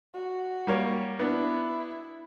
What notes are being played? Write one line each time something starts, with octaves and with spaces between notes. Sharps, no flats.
F#4
G3 A#3 C#5
B3 D4 E4